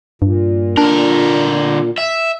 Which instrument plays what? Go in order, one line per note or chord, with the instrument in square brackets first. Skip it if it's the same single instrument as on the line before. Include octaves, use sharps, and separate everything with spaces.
[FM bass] G2 [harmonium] A#2
[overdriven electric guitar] D3 A#4 [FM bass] D4
[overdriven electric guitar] E5